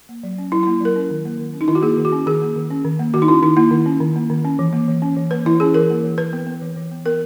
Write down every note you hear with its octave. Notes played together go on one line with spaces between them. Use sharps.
A#3
F#3
C#4
F#3 E4
A#3 E4
F#3 A#4
C#4
D#3
A#3
D#3
C#4
D#4
D#3 E4
F#4
A#3 G#4
D#3
F#4
C#4
D#3 G#4
A#3
D#3
C#4
D#3
A#3
D#3 F#4
D#4
C#4 E4
D#3 D#4
A#3 E4
D#3
C#4
D#3
A#3
D#3
C#4
E3
A#3
E3
C#4
E3
A#3 B4
E3 E4
C#4 G#4
E3 A#4
A#3
E3
E3 B4
B3
B3
E3
E3
B3
B3 A#4